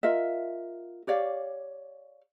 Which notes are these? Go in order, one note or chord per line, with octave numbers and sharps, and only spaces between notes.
F4 A#4 D#5 E5
G4 C#5 D5 F5